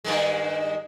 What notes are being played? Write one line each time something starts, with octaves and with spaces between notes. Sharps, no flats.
G2 D#3 G#3